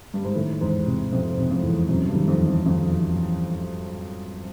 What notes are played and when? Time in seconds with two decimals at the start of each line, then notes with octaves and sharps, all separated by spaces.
0.14 G2
0.24 G#2
0.35 A2 D#3
0.61 E2 G#2
0.86 C3
1.12 F2 C3
1.38 C3
1.51 F2
1.63 E2
1.89 F#2 C3
2.08 G2
2.15 D#3
2.28 F2
2.40 E2
2.47 F2
2.65 F2 D#3
2.91 E2
3.16 E2